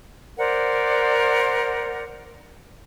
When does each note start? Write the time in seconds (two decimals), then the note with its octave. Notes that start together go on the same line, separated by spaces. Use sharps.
0.38 A#4 C5 D5 F#5